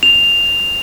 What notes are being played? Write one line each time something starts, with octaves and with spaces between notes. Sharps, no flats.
F7